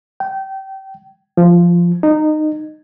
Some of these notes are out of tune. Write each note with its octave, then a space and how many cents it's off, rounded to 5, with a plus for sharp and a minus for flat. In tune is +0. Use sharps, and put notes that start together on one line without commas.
G5 -25
F3 -10
D#4 -20